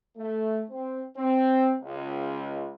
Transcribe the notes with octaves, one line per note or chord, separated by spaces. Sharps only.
A3
C4
C4
C#2